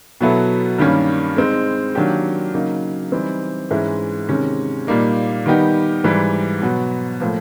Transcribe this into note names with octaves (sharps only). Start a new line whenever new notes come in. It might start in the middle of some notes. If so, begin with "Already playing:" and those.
B2 F#3 B3 E4 A4
G2 D#3 G3 A#3 C#4
G#3 C4 D#4
D#3 F#3 A#3 D4 G4
C#3 F#3 A#3 D#4
E3 G3 C4 D#4
G#2 E3 G#3 C#4 E4
C3 D#3 G#3 C#4
A#2 G3 A#3 D#4
D#3 G3 B3 D#4 G4
G#2 E3 G3
B2 F#3 B3
A2 F3 A#3